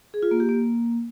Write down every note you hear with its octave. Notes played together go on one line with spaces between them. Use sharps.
G#4
F4
A#3
G4
A#3